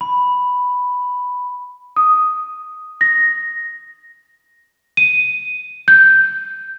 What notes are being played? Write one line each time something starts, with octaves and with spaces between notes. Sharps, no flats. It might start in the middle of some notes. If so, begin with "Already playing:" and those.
B5
D#6
A#6
D#7
G6